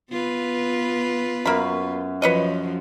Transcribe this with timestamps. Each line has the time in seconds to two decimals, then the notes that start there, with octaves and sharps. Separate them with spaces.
0.10 B3 F4 B4
1.46 F#2 A#3 B5
2.22 F3 F#3 B4 C#5 D#5